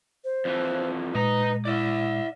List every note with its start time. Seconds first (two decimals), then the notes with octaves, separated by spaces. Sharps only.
0.24 C5
0.45 F2 E3
1.15 A#2 G#3 B4 D#5 A#5
1.65 E4 D5 E5